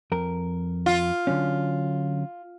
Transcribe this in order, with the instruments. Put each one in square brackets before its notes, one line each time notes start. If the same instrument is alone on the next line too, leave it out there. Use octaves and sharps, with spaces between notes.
[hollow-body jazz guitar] F2 A#4
[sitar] F4
[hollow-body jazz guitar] D3 F#3 C#4